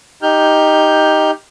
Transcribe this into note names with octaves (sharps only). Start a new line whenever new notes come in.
D#4 G4 F6 G6